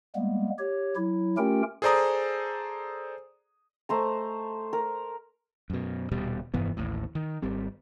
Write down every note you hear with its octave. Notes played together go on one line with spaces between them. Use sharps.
G3 G#3 A#3 B3
G4 C#5
F#3 E4
A3 C#4 F4 G4 A#4 G5
G#4 A4 C5 D5 A#5 D#6
A3 C5 A#5
A#4
F#2 B2
D#1 B2 G3
F1 G2 E3 B3
A1 D#2 A2
D#3
G#1 G3 C4